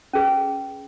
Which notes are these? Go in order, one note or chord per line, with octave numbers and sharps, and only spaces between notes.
C#4 G#4 B4